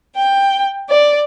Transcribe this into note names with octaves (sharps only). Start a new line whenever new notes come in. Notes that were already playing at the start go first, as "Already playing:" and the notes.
G5
D5